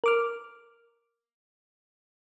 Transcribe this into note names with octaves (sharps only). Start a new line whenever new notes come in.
A#4 D6 F6